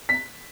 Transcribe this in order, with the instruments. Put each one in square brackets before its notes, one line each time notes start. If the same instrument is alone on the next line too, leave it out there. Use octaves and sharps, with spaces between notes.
[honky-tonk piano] B6